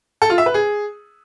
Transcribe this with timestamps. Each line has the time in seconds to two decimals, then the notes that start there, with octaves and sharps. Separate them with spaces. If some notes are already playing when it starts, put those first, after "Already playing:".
0.22 A4
0.30 F4
0.38 E5
0.46 B4
0.54 G#4